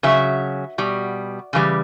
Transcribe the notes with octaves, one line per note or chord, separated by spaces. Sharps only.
C#3 F#3 E5
B2 G3
C#3 E3 G3